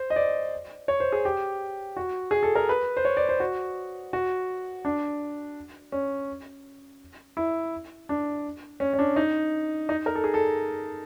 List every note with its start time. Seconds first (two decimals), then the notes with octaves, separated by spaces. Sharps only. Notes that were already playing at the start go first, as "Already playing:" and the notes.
Already playing: C5
0.10 D#5
0.16 D5
0.88 C#5
1.00 C5
1.12 G#4
1.25 G4
1.97 F#4
2.31 G#4
2.43 A4
2.55 A#4
2.69 B4
2.97 C5
3.05 C#5
3.17 D5
3.29 C5
3.40 F#4
4.13 F#4
4.85 D4
5.92 C#4
7.37 E4
8.09 D4
8.80 C#4
8.94 C#4
8.99 D4
9.16 D#4
9.89 D#4
10.06 A#4
10.15 A4
10.24 G#4
10.34 A4